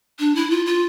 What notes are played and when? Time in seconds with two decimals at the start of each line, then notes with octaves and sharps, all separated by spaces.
0.19 D4
0.35 E4
0.51 F4
0.66 F4